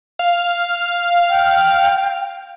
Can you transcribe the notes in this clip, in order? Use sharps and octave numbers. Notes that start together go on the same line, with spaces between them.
F5
G5